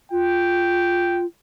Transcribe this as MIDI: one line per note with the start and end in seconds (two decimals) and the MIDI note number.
0.11 1.26 65
0.11 1.23 79